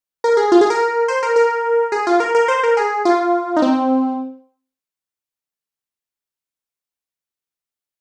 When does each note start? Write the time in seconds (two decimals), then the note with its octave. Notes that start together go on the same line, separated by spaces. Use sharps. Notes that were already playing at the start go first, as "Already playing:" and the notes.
0.24 A#4
0.37 G#4
0.52 F4
0.61 G#4
0.70 A#4
1.08 C5
1.23 A#4
1.36 A#4
1.92 G#4
2.07 F4
2.20 A#4
2.35 A#4
2.48 C5
2.63 A#4
2.77 G#4
3.05 F4
3.56 D#4
3.62 C4